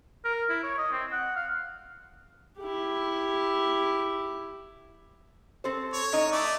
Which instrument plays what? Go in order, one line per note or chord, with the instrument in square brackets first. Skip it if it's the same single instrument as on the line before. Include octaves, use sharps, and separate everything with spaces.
[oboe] A#4
E4
C#5
D#5
C4
F#5
F5
[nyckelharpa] E4 G4
[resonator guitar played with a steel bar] C4 A4 C5
[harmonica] C#5
[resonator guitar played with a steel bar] A2 D#4
[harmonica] A3 D5